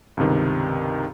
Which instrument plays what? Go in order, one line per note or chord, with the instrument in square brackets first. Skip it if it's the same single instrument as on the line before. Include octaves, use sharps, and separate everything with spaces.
[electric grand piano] C#2 G2 C3 D#3